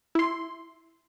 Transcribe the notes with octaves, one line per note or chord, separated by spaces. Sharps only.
E4 C6